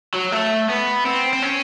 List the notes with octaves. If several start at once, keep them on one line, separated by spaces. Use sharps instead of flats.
F#3
A3
B3
C4
C4
C#4